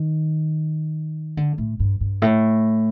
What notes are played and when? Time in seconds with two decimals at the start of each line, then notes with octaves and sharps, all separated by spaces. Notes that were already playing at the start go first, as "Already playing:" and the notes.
Already playing: D#3
1.37 D3
1.58 A2
1.80 G2
2.00 G2
2.22 A2